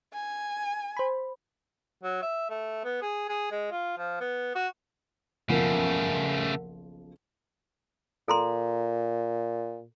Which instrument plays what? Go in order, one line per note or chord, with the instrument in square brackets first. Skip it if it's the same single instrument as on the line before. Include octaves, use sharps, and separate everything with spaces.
[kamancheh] G#5
[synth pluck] C5 B5
[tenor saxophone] F#3
E5
A3
B3
G#4
G#4
G#3
F4
F3
B3
F#4
[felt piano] F#1 B1 F3 [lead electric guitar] C#3 A3 [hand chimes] A#4 F#5
[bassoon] A#2 [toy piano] A4 A#5 C6